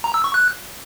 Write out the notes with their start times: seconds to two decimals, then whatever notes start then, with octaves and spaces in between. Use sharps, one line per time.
0.04 A#5
0.14 E6
0.24 C#6
0.34 F#6